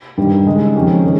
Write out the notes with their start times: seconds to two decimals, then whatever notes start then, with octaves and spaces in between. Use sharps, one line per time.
0.18 G2 D#3 G3
0.46 C#3 G#3 D#4
0.75 F2 D#3 G#3 C#4 G4
1.04 D#3 G#3 C#4 G#4